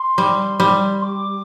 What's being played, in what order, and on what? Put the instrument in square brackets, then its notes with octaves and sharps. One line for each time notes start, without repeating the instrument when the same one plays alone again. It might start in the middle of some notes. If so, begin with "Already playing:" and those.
Already playing: [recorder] C6
[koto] G3
G3
[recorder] D6